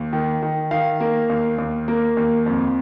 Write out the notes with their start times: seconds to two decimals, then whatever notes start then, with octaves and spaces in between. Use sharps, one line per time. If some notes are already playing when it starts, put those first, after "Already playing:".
Already playing: D#2
0.13 D#3
0.42 D#3
0.71 D#3 F5
1.00 A#3
1.30 D#2
1.58 D#2
1.88 A#3
2.17 D#2
2.46 F2